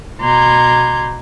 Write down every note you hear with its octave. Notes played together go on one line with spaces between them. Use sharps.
B2 A#5 C6 D6 G6 G#6